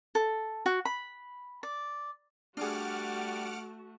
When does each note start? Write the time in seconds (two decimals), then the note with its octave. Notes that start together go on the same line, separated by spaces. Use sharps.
0.15 A4
0.66 F#4
0.85 B5
1.63 D5
2.57 G3 A3 D4 F#4 G#4 F#5 D6 F6